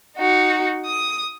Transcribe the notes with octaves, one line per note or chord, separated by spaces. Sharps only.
D#4 F#4
D#6